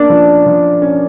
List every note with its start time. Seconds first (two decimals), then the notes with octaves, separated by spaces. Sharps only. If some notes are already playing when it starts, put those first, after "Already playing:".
Already playing: A#3 C#4 D4
0.10 F3
0.46 F3
0.82 C#4